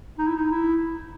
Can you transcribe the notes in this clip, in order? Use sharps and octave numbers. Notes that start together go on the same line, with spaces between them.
D#4
E4
D#4
E4